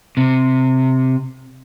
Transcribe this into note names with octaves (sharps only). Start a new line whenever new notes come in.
C3